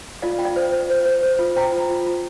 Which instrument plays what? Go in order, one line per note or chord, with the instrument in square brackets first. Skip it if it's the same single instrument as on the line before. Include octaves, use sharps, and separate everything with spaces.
[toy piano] F4 D5 F5
F4 G5
D5 F5
C5
C5
C5
C5
C5
F4
C5 G5 A#5
F4
F4
F4